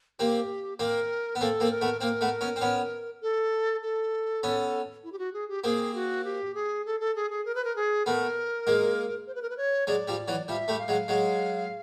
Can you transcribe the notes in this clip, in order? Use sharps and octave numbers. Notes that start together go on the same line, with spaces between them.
A#3 C4 G4
A#3 C4 A#4
B3
A#3 C4 A4
A#3 C4
A#4
A3 B3
A#3 C4 A#4
A3 B3
B3 C#4
C4
B3 C#4
A4
A4
B3 C#4
E4
G4
F#4
G#4
G4
A#3 C4 G#4
F#4
G4
G#4
A4
A4
G#4
G#4
A#4
B4
A#4
G#4
A3 B3 A#4
G#3 A#3
C5
B4
A#4
B4
C#5
F#3 G#3 D5
F3 G3
E3 F#3
F3 G3 E5
G3 A3
F5
F#3 G#3
F#3 G#3